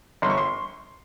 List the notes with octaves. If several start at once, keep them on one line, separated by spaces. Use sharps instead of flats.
G1 C6
C#6
C6